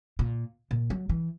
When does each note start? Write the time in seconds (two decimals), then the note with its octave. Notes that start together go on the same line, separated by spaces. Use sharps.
0.19 A#2
0.71 A#2
0.90 F#3
1.09 E3